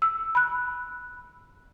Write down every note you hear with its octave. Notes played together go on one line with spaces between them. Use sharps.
E6
B5 F#6